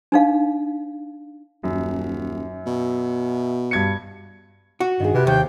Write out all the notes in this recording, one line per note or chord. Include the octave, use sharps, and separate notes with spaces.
D4 D#4 F5
D#1 F#2
B2
G2 G#6 C#7
F#4
G2 D#3 G#4
C3 B4
D#2 C5 G5